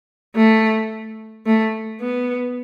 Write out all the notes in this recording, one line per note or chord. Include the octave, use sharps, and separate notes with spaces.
A3
A3
B3